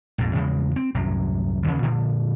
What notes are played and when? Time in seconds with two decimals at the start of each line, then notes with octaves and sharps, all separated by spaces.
0.18 A#1 F2 G#2
0.35 E2 C#3 F3 G#3
0.76 C4
0.95 C2 F#2 A2 F#3
1.66 D#2 C#3 F3 C#4
1.83 A#2 D3 F3